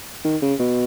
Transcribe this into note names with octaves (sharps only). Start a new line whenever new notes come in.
D#3
C#3
B2